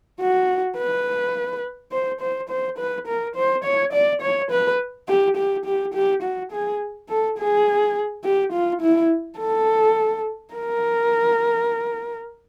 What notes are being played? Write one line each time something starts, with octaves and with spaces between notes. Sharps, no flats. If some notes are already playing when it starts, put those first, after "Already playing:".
F#4
B4
C5
C5
C5
B4
A#4
C5
C#5
D5
C#5
B4
G4
G4
G4
G4
F#4
G#4
A4
G#4
G4
F4
E4
A4
A#4